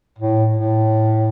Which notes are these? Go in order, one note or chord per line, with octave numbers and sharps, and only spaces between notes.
A2
A2